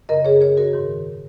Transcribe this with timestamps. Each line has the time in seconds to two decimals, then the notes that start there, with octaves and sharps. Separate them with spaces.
0.09 F#2 C#3 A#4 D#5
0.25 G#4 C#5
0.41 G#4 C#5
0.57 F#4 A#4
0.73 G#2 D#3